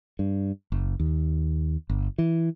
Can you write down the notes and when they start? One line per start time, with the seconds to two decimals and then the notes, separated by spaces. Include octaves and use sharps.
0.19 G2
0.72 F#1
1.00 D#2
1.90 G1
2.18 E3